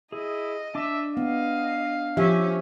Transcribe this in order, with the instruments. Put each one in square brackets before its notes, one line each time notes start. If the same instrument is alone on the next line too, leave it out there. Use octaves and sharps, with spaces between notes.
[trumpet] E4 [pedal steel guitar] G#4 [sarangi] D#5
[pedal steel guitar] D4 D6 [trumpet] E5
[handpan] B3 [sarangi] D#5 [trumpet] F5
[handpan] F3 G4 E5 [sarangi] C#4